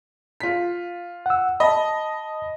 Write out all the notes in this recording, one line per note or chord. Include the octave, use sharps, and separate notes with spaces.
F4 B6
F#5 E6
D#5 A5 B5